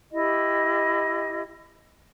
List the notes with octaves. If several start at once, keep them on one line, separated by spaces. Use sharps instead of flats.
E4 G4 D#5